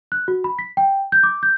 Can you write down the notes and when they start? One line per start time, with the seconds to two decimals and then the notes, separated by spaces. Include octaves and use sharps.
0.12 F#6
0.28 F#4
0.44 B5
0.59 B6
0.77 G5
1.12 G6
1.23 D6
1.43 G6